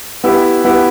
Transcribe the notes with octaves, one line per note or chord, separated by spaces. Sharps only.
B3 E4 G4
B3 E4 G4